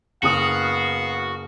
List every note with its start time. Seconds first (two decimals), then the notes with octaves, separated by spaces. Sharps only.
0.23 F#1 B3 F#4 F5 D#6 F7